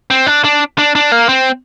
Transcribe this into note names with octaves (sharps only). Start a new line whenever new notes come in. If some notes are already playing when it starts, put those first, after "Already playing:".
C4
D4
D4
D4
D4
A#3
C4